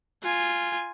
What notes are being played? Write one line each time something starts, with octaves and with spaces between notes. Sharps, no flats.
F4 G#5